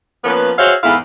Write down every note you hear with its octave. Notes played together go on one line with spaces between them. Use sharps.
F3 A#3 B3 C#4 B4
F#4 G#4 C5 C#5 E5 F5
E2 G#2 E4 A4 F5